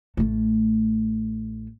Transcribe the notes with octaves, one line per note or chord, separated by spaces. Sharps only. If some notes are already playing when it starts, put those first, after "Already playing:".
A1 A3